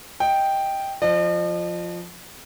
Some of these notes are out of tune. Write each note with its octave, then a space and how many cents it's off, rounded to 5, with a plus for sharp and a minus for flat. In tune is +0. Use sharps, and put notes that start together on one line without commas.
D#5 +15 G5 +0
F3 +0 D#5 -45